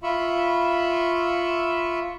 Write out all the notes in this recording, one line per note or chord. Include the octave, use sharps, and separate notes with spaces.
F4 E5 B5 C#6